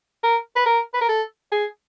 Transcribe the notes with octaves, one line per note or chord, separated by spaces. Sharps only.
A#4
B4
A#4
B4
A#4
A4
G#4